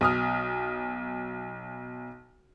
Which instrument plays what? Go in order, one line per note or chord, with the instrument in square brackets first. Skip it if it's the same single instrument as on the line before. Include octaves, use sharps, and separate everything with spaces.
[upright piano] B1 D#6 F6